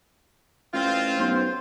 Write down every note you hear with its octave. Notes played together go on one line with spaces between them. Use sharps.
A1 C4 F4
B1 C5